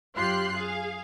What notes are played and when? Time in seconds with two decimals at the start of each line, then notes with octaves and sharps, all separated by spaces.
0.15 F#2 F4 G4 C6 F#6 C7
0.57 G#4 F5